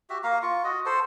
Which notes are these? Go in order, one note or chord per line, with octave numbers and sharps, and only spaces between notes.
F#4 G4 E5
A#3 F5 A#5
F4 C#6
F#4 D#5
A4 C5